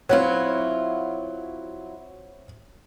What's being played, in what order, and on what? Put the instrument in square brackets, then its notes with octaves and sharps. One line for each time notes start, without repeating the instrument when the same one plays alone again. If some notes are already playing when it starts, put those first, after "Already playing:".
[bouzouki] F#3 E4 F4 [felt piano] C4 C#5